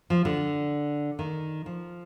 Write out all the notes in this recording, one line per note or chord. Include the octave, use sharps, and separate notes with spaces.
F3
D3
D#3
F3